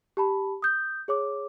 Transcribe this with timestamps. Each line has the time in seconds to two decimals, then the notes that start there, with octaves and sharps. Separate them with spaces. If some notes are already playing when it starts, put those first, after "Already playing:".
0.17 G4 A5 B5
0.62 D#6 G6
1.08 G#4 C#5 D6